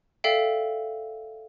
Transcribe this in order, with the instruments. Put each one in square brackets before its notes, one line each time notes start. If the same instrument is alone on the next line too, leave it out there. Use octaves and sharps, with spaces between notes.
[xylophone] A4 D5 E5 F5 G5